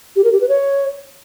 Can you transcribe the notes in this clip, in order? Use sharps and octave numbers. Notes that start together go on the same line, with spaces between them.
G4
A#4
G4
B4
C#5